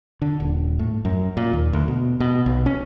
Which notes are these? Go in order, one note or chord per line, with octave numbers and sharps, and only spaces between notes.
D3
D#1
A2
F#2
A#2
D#2
D2
B2
B2
B1
C#4